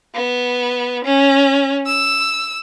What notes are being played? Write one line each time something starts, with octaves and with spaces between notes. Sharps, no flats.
B3
C#4
E6